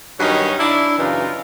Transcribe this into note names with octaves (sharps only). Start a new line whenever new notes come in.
G2 D#3 F#3 C#4 D#4
D4 E4
F#2 C#3 E3 D#4 F4